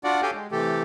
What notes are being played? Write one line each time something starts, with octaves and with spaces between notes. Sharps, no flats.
D4 F4 F#4 D5 F#5
G4 A4 C#5 F5 G5 G#5
G#3
C3 E3 A3 G4 A4